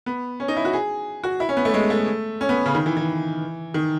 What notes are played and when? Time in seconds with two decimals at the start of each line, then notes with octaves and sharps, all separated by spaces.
0.06 B3
0.40 C#4
0.48 D#4
0.57 E4
0.65 F#4
0.73 G#4
1.24 F#4
1.40 E4
1.49 C#4
1.57 B3
1.65 A3
1.74 G#3
1.90 A3
2.41 C#4
2.49 B3
2.66 C#3
2.75 D#3
2.86 E3
2.97 E3
3.74 D#3